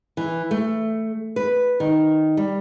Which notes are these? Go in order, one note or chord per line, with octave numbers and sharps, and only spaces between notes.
E3
A3
B4
D#3
G3